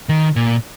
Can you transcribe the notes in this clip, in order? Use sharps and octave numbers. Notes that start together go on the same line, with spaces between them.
D#3
A#2